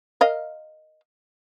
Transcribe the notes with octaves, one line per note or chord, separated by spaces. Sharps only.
A#4 D#5 F5